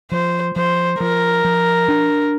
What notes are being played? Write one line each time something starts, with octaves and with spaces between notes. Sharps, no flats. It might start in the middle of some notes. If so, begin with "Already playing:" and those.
F3 C5
F3 C5
F3 A#4
F3
D4